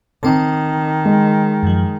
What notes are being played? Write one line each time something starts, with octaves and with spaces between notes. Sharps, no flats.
D#3 C4 A5
G#3
F#2 F3